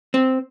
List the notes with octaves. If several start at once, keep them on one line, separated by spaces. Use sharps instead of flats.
C4